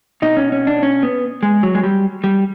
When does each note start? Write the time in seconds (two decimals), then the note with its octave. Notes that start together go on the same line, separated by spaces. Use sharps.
0.22 B2 D#4
0.37 C#4
0.52 C#4
0.67 D4
0.83 C#4
1.03 B3
1.43 G#3
1.63 F#3
1.75 G#3
1.84 G3
2.24 G3